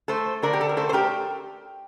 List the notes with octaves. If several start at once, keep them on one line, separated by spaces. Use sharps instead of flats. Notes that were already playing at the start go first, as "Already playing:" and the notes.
A3 A4 C5
D3 A#4 D5
G4
A4
A#4
A3 A4 C5
C5
G4 A#4